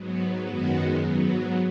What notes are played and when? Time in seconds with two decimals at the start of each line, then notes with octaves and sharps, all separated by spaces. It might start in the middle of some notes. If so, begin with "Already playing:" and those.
Already playing: G#2 F#3 B3
0.46 F#2 D#3 G#3 B3 F#4
1.00 G#2 F#3 B3